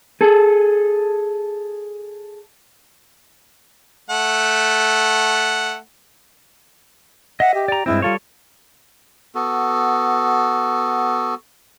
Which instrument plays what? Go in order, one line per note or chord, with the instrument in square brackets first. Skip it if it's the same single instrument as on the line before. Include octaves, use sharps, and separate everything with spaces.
[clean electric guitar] G#4 A4
[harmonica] A3 F#5
[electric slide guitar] D#5 E5 [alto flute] F#5
[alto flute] G4
[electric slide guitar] D5 A#5
[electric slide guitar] G2 G#3 C4 [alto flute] E4
[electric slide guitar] G3 A4 C#5 [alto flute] F4
[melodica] B3 F#4 A4